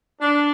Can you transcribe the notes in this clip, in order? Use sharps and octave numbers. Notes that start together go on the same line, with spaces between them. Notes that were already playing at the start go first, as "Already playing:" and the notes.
D4